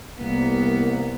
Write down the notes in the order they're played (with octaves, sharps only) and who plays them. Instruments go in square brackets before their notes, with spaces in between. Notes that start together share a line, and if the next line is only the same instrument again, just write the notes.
[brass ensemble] C2 A#3 [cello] B3